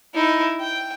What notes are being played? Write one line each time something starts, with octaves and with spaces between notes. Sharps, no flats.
D#4 E4
G5